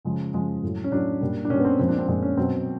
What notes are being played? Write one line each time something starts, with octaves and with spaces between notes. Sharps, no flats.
C#3 F3 G#3
C#3 F3 G#3
A2 F#3
C#4
A2 F#3 D4
A#2 G3
D4
A#2 G3 C#4
B3
C4
A#2 F3 G#3 C4
D4
C4
A#2 F3 G#3
C#4
B2 F#3 C4